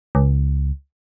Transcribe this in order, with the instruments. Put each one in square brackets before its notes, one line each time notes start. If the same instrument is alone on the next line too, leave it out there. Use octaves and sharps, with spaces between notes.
[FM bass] C#2